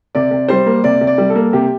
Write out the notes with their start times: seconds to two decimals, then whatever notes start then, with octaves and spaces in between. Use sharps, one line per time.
0.15 C3 D5
0.31 C3
0.48 G3 C5
0.66 A#3
0.84 C3 D5
1.01 C3
1.07 D5
1.18 G3
1.30 A4
1.35 A#3
1.53 C3 G4